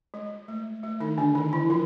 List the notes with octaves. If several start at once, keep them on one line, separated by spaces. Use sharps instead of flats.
G#3
A3
A3
D#3 D#4
D3 D4
D#3 D#4
E3 E4
F3 F4